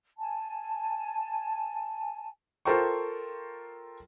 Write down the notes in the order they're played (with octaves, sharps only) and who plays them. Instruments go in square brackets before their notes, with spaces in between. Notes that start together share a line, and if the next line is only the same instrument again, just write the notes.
[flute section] G#5 A5
[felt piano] F4 A4 A#4 C5 G5 C#6